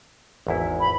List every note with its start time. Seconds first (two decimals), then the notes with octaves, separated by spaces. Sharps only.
0.47 G#1 E2 E4
0.80 B5